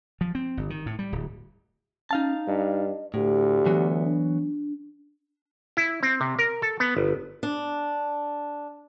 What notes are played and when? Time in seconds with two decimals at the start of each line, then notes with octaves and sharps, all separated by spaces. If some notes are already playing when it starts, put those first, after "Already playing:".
0.21 F3
0.35 C4
0.57 G1
0.70 D#3
0.86 A2
0.99 G3
1.12 D1
2.11 C#4 D#4 F5 A5
2.47 G2 D#5
3.14 D2 A2 G4
3.66 E3 F#3 B3
4.05 D4
5.77 E4
6.03 C4
6.21 C3
6.39 A#4
6.62 A4
6.80 B3
6.97 G1
7.43 D4